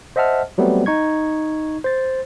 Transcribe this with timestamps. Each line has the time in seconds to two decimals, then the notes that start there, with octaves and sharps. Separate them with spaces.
0.16 C5 D#5 E5 F#5 A5 F6
0.58 F#3 G3 A3 B3 C4
0.86 D#4 C#6 G#6
1.84 C5 A6